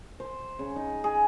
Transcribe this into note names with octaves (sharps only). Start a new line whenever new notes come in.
C5
C#3
D#4
G#4